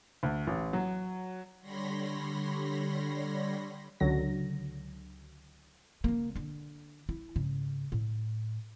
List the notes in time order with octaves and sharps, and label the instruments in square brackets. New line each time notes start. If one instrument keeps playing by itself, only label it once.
[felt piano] D2
A1
F#3
[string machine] D3 G3 C#5 B5 C6 A#6
[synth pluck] C#2 D3 F#3 A#6
[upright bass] C#3 A#3
D3 D4
E4
G#2 C#3
A2